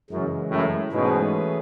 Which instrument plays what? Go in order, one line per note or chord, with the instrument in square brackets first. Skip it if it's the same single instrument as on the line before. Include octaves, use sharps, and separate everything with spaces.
[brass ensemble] F#2 [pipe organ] C#3 E3 G#3
[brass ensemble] F#2 A2
[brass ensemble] G#2 B2 [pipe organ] E3 A3 C#4 G#4 B4